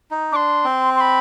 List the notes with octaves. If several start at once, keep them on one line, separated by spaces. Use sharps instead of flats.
D#4
D4 C6 D6
C4
C6
B5